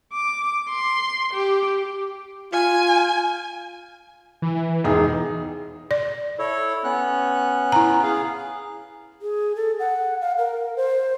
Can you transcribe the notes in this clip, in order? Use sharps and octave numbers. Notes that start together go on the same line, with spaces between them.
D6
C6
G4
F4 G#5
E3
E1 D#4 G#4
D5
E4 A4 C#5
B3 C#4 F#6
E4 A#5
G#4 F5
G#4
A4
F#5
F5
A#4
C5